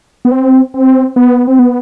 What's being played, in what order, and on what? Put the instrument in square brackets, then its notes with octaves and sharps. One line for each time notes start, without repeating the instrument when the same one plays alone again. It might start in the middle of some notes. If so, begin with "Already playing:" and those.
[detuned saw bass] B3
C4
C4
B3
C4
B3